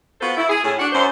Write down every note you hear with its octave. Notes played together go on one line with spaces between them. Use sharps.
B3 F4 F#4 A4 C5
E4
G#4
A2 C#4 G#4
D4 F#4 F#5
F#2 C5